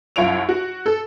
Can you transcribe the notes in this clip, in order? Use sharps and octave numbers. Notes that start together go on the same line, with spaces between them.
C2 F#2 F4 C#5 D7 F7
F#4
A4